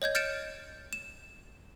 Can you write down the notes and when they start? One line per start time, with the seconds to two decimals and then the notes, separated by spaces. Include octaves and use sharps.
0.02 C#5 D#5 G6 G#6
0.15 F6 G6 A6 C#7 D7 E7
0.93 E7